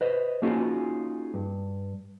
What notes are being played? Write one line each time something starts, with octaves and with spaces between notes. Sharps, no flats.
B4 C5 D#5
A#3 C#4 D#4 F4 F#4 G#4
G2